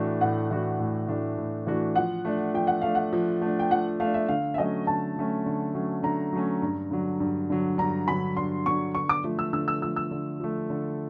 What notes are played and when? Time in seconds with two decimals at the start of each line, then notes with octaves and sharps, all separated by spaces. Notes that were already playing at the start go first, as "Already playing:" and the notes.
Already playing: A2 E3 A3 D4 F#4
0.21 A2 F#5
0.51 E3 A3 D4 F#4
0.80 A2
1.08 E3 A3 D4 F#4
1.38 A2
1.67 E3 A3 D4 F#4
1.95 F3 F#5
2.25 A3 D4
2.54 F3 G5
2.67 F#5
2.82 A3 D4 F5
2.95 F#5
3.13 F3
3.42 A3 D4
3.59 G5
3.71 F3 F#5
4.00 A3 F5
4.05 D4
4.14 E5
4.28 D3 F5
4.54 E5
4.58 F#3 A3 C#4 D#5
4.87 D3 A5
5.16 F#3 A3 C#4
5.46 D3
5.74 F#3 A3 C#4
6.03 D3 A#5
6.33 F#3 A3 C#4
6.62 G2
6.91 D3 F#3
7.20 G2
7.50 D3 F#3
7.78 G2 A#5
8.07 D3 F#3 B5
8.37 G2 C6
8.66 D3 F#3 C#6
8.95 D3 C#6
9.09 D6
9.24 F3 A3
9.39 E6
9.53 D3 E6
9.68 E6
9.82 F3 A3 E6
9.96 E6
10.11 D3
10.40 F3 A3
10.70 D3